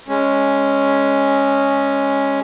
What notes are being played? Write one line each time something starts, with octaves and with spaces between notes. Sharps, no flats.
G#3 C#4